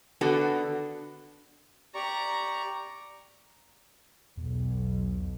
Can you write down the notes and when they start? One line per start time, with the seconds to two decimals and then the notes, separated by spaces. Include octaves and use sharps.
0.21 D3 B3 F#4 A4
1.95 G4 D5 A#5 C#6
4.37 B1 E2